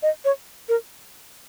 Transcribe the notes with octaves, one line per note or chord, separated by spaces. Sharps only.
D#5
C#5
A#4